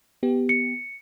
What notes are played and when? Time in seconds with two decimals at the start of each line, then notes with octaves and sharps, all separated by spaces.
0.23 B3 G4
0.49 C#7